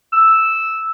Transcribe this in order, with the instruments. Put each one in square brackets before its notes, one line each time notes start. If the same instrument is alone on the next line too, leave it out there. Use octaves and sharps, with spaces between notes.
[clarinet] E6